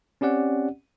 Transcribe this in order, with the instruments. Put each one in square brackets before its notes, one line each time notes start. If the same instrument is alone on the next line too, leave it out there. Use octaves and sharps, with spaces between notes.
[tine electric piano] C4 C#4 G4 D5 F#5